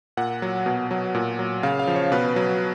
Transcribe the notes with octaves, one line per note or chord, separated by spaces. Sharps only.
A#2 F#5
F#3
B2
F#3
A#2
F#3
C#3 F5
F5
F3
C#5
B2 B4
F#3